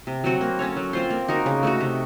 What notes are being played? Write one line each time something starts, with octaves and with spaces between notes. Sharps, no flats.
C3
F#3 C4 F#4
A#3
C#4 A4 C#5
F#3
C4 F4 C5
A#3
D#4 F#4 A#4
C#3
A3 D#4 F#4
C3